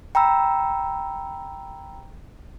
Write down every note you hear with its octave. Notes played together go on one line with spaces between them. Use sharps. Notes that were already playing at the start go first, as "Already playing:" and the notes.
G5 A#5 B5 E6